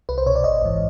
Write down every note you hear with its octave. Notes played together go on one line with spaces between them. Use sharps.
C2 B4
C5
B2 C#5
D5
G#1 D#5
G#2 E3